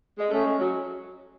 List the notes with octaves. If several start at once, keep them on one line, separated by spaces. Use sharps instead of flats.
G#3
A3 C#4
G#3
F#3